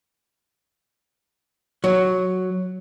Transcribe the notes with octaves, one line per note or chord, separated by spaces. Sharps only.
F#3